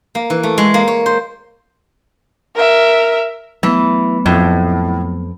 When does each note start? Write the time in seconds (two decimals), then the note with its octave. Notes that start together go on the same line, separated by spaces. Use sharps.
0.15 A#3
0.30 E3
0.43 A3
0.58 G#3
0.74 A#3
0.87 C#5
1.06 C5
2.55 A#4 E5
3.63 E3 F#3 A3 B3
4.26 F2 A2